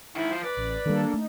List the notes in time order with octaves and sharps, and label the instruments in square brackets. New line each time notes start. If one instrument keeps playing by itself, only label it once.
[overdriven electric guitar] G#2 D#3 [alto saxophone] E4
[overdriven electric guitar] F3 C5
[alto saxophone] B4 [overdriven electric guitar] D5
[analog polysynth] A1
[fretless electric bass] D#3 G3 [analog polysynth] A#3 D4 A4
[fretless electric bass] A3 [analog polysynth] D#4